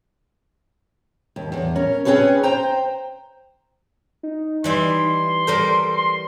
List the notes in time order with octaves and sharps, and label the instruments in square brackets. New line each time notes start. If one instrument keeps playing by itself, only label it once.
[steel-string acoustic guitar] D#2
E2
C#4 A#4
C4 C#4 E4 G#4 B4 C#5
C5 G5 A#5
[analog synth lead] D#4
[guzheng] E3 G3 E5 [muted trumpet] C6
[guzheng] G3 A#4 C5 [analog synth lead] A4
[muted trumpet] C6 [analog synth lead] C7